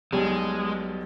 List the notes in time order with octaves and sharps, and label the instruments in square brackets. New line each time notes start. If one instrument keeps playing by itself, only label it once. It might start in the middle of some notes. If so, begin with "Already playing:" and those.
[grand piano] B1 B2 G3 [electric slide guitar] G#3